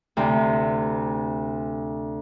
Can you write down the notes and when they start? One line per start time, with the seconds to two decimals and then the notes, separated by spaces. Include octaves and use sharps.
0.17 D2 C3